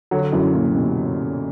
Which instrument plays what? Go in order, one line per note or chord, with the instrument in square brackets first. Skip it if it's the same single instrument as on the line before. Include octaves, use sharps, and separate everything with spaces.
[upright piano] D3 [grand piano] F#3
[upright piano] F#2 [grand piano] E3
[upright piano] F#2 [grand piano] A#2
[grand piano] C3
B2